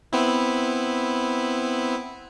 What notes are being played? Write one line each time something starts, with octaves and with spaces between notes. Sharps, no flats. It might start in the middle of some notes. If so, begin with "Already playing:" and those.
B3 C4 E4